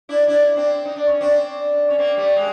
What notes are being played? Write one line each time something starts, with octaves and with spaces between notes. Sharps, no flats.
D4 E4
D4 E4
C4 D4
D#4
D4
C#4
C4 D4
C#4
A#3 C4
G3 A3
G#3 A#3